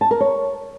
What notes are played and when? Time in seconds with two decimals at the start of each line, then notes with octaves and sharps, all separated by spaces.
0.01 A5
0.11 A#4
0.20 C#5